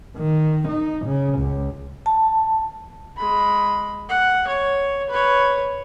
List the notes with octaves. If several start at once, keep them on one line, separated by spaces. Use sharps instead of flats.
D#3
D#4
C#3
C#2
A5
G#3 B5
F#5
C#5
B4 C#5